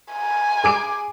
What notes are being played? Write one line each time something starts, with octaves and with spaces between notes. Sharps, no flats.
G#5
G#4 D6 D7